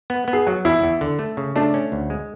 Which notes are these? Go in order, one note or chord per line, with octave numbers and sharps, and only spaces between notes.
B3
B3
G#4
F#3 F#4
E2 E4
E2
D3
A3
C#3
A3 D4
C#4
D2
G#3